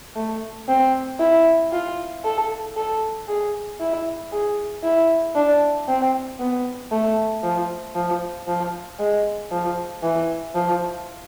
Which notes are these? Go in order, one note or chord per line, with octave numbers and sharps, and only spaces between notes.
A3
C4
E4
F4
A4
A4
G#4
E4
G#4
E4
D4
C4
B3
A3
F3
F3
F3
G#3
F3
E3
F3